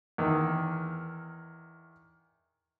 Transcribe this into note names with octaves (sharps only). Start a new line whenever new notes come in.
E2 D#3